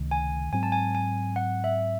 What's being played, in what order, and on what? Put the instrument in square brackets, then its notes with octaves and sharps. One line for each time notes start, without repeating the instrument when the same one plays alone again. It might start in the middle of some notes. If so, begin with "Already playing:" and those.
Already playing: [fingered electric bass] C#2 C3 D#3 A3
[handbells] G#5
[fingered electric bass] G#2 F#3 C4 [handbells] G#5
[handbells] A5
G#5
G#5
F#5
E5